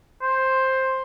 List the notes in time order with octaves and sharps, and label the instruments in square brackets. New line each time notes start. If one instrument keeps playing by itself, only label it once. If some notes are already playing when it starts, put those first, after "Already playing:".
[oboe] C5